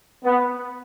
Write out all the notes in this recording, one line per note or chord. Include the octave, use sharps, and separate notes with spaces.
B3